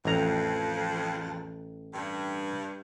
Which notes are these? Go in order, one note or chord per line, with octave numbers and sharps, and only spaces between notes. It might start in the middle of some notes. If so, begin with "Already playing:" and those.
A1 F2 A#5
G2